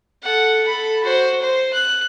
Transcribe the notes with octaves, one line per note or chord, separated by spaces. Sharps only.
A4 F#5
A4 B5
F#4 C5
C5
F#6